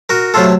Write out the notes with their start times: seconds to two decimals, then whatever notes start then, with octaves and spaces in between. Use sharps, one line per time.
0.09 F#4 A#4
0.34 C3 F#3 A3 F4 A4